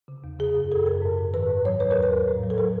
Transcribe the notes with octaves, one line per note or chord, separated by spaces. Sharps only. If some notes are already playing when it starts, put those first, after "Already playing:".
C#3
E2
C#3 G#4
F#2
F#2 A4
F#2 A#4
G#2
G#2
D#3 B4
G#2
F#3 C#5
E2 B4
E2 A#4
B4
E2
A2
F#3
A4
F#3 A#4